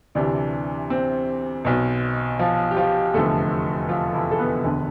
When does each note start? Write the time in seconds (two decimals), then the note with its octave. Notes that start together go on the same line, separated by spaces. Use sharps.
0.15 D2 C3 E3 D4
0.90 C4
1.65 B1 B2
2.39 F3 F4
2.71 G4
2.77 F3 F4
3.14 F1 E2 D3 F3 A3 A4
3.89 F3 F4
4.14 E3 E4
4.31 A4
4.39 B3 B4
4.64 E1 D2 D3